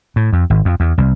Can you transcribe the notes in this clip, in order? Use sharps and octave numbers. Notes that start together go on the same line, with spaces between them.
A2
F2
G#1
F2
E2
C2